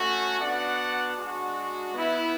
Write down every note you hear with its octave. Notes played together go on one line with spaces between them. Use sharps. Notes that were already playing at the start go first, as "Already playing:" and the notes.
Already playing: A3 C#4 F#4
B3 D4 F#4 D5 F#5
G#3 D4 F#4
B3 E4